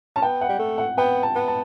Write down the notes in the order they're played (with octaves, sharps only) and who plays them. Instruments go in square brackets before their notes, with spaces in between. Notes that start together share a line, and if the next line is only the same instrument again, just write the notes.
[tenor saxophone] C#4 [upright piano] A5
[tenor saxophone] B3 [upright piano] G5
[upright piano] F#5
[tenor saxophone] G3
A3
[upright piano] F#5
[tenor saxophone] B3 [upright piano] G5
[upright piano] A5
[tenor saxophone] B3
[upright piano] A5